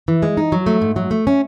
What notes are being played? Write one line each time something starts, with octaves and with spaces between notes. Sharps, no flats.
E3
G#3
D#4
F#3
A3
G#2
F#3
A3
C#4